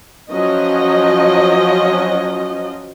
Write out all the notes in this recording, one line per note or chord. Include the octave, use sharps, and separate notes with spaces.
F3 F#3 C#4 D#5